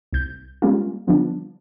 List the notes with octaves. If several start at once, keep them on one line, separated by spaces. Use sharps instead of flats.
C2 G6
G3 G#3 A#3 C#4 F4
D3 F3 G3 B3 D4